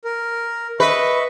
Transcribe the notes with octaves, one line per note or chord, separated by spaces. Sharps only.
A#4
B4 D#5 E5 C#6